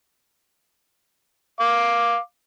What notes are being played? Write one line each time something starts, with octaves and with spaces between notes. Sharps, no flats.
F5 D6